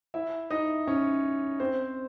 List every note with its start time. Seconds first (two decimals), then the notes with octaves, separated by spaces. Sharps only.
0.14 E4 E5
0.50 D#4 D#5
0.87 C#4 C#5
1.60 C4 C5